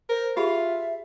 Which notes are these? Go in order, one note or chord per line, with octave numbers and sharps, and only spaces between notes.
A#4 C5
F4 G4 G#4 E5 B5